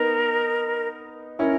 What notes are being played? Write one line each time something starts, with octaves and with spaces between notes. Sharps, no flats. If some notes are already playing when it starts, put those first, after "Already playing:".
Already playing: B3 D#4 A#4
C#4 E4 A#4